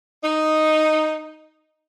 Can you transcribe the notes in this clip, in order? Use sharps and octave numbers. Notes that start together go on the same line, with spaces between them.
D#4